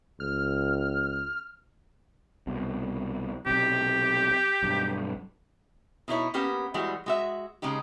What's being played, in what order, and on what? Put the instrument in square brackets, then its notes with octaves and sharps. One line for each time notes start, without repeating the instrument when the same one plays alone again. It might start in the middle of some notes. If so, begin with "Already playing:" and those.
[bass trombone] C#2 [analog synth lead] F6
[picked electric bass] C2 B2
[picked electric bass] B1 C3 [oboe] G4
[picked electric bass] B1 G2
[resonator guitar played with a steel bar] B2 D#4 E4 C#5
A#3 B3 C#4 G4
E3 G3 G#3 F#4
G#3 F#4 E5
C#3 G#3 C#4 D#4 G4